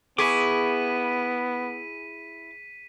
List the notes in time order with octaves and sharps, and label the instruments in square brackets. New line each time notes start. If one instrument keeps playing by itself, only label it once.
[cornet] B3 [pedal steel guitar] E4 C#6 D6 [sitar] G#4 [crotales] B6 D#7